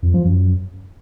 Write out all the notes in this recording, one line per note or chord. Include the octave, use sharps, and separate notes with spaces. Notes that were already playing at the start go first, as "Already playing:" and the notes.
F2
F3
F#2